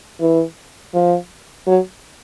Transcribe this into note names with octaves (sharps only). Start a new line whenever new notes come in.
E3
F3
F#3